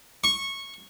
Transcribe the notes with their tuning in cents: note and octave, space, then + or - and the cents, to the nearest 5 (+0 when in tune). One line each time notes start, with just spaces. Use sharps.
C#6 -15